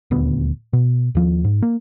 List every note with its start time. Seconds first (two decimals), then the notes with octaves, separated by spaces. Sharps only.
0.11 D#1 D2 B3
0.73 B2
1.15 D#2 F3
1.44 G#2
1.63 A#3